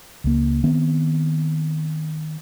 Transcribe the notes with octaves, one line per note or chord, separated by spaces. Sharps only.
C#2 A#3
D#3 B3 C4